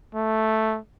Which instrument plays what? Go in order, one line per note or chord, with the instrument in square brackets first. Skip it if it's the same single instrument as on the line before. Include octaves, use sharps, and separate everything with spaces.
[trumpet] A3